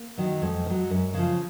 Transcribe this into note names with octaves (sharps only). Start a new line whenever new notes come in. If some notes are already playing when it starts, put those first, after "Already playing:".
Already playing: A#3
D#3 F#3
F2 G#3
D#3
F#3
F#2
C#3 F3